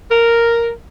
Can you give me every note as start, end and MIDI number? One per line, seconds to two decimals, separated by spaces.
0.10 0.69 70